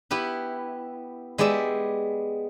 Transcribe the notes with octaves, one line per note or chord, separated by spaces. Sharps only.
B3 E4 G4 B4
G#3 B3 G4 D5 E5